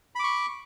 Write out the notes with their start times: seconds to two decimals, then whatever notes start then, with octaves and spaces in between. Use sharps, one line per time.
0.15 B5
0.20 D6
0.24 C#6